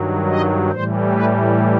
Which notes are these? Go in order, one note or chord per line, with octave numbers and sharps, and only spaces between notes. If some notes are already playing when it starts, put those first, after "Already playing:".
Already playing: G2 D#3 F#3
D#5
A2 E3 G3 C5
B4